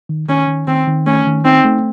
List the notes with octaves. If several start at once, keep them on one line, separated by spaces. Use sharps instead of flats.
D#3
D#3 C#4
D#3
D#3 C4
D#3
A3 C#4
D#3
C4 D#4
A3